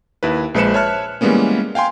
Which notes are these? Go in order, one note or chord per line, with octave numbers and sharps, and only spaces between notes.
D#2 E4 B4
A#1 G#3 B4 C5 C#7 E7
B4 C#5 E5 A5 F6 F#6
E3 G3 G#3 A#3 B3 C#4
F5 G5 G#5 C6